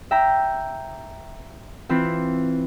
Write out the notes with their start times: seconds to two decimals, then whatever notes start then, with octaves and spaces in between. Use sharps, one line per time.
0.11 E5 G5 A#5
1.89 E3 C4 E4 F4